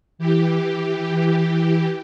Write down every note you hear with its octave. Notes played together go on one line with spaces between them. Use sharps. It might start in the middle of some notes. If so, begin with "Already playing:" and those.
E3 G4